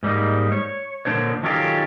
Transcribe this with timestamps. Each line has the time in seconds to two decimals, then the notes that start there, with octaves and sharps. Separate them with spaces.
0.03 G#2 G3 A#3 D#4
0.52 C#5
1.05 A#2 D3 G3 D4 C5 C#5
1.43 D#3 F#3 C#4 F4 G4 A4